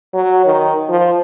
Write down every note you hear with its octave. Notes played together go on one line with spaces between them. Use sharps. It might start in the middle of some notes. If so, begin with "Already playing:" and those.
F#3
D#3
F3